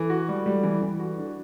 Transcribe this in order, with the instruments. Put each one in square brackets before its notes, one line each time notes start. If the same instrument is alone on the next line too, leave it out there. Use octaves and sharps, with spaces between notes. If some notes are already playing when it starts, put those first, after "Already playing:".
Already playing: [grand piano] E3 [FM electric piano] A4
[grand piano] F#4
G3
G3
E3
E3
F#4
D4